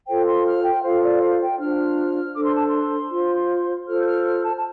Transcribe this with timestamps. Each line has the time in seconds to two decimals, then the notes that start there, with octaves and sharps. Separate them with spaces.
0.07 F4 A4 C5 G5
0.27 C6
0.46 F6
0.65 G5
0.84 F4 A4 C5 F5
1.03 D5
1.22 F5
1.40 G5
1.59 D4 F4 C5 F6
2.35 D4 A4 C5 D6
2.46 C6
2.56 A5
2.67 C6
3.11 F4 C5
3.87 F4 A4 C5 F6
4.01 G6
4.06 F6
4.25 F6
4.44 A5
4.56 A5